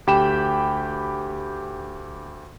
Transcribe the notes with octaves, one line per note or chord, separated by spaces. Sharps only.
D2 G4 G5 B5 E7